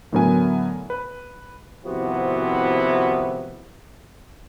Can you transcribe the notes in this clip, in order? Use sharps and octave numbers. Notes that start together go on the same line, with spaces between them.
A2 D3 F#3 B3 A#4 G#5
B4
G#1 C3 F3 B3 E4 F#4